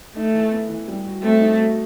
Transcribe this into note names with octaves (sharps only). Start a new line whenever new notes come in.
A3 D#4
E3
B3
E3
G3
F#4
A3 C4
D#4
F#4